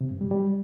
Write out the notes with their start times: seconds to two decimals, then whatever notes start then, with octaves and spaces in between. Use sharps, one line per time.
0.01 C3
0.11 G2
0.21 G3
0.31 G3